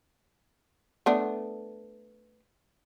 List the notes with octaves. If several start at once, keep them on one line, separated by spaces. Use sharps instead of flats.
A3 B3 D4